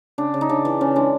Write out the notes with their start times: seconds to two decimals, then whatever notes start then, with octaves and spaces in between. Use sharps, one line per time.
0.18 C#3 D4
0.34 C#3
0.41 D#4
0.49 C#3 D4
0.65 E3
0.81 C#3 C#4
0.96 G#3 D4